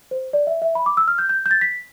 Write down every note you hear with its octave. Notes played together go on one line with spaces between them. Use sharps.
C5
D5
E5
E5
B5
D6
E6
F6
G6
G6
G6
A6
B6